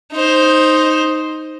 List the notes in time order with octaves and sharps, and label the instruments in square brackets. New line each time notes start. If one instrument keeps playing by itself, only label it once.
[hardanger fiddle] D#4 C5